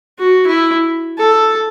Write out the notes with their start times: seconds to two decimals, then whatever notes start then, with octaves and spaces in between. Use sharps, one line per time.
0.19 F#4
0.47 E4
1.18 A4